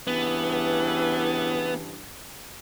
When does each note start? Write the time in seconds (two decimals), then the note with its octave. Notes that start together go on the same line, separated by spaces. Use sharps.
0.07 G2 C#3 E3 B3